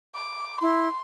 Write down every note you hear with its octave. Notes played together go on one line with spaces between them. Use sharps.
D6
E4 C6